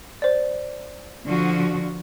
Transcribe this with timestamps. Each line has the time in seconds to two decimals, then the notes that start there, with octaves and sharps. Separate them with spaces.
0.22 C5 D5
1.27 D3 F3 F#4